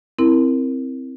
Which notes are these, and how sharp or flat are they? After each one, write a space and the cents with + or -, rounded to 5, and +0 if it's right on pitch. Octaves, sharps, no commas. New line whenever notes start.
C4 +0 E4 +0 A#4 -5